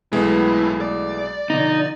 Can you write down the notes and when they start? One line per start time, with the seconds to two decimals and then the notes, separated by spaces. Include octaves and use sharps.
0.13 B1 A2 E3 G#3 A3 B3 E4
0.81 D5
1.50 B2 D3 F3 D#4